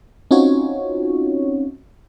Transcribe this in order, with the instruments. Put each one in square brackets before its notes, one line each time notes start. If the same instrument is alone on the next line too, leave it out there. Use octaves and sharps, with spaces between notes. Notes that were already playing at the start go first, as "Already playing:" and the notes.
[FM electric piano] C4 C#4 D#4 F4 F#4 C#5